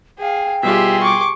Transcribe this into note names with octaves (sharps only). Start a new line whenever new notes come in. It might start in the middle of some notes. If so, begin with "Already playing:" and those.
G#4 F5 G5
B2 G3 F4 G4 G#4 E5 C6
C#6 D6